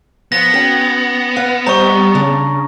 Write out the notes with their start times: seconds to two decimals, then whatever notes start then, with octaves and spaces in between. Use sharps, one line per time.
0.32 F3 B3 A#6
0.53 C#4 F#4 G5
1.36 B4 F5 F#5
1.67 G3 C5 D#5 A#5 C#6
2.15 C#3 D4